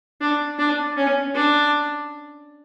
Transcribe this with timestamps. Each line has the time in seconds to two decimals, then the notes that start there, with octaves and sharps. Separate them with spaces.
0.21 D4
0.59 D4
0.97 C#4
1.35 D4